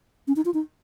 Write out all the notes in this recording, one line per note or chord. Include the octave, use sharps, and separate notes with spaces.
C#4
D#4
F4
D#4